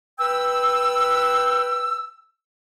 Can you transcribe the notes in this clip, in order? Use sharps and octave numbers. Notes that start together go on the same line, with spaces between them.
B4 G5 E6